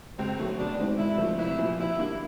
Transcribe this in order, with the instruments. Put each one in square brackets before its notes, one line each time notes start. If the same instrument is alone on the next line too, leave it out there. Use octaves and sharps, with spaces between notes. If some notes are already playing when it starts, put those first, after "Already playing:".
[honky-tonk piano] C#2 [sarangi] C4
[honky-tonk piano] B2 F#3 A3
[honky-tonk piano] B2 [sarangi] D4
[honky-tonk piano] G#3 C4 D#4
[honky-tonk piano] G#2 [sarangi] E4
[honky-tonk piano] F3 A3 C4
[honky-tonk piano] C2 [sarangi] E4
[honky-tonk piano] A#2 F3
[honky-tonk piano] B2 [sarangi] E4
[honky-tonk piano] G3 A#3 D4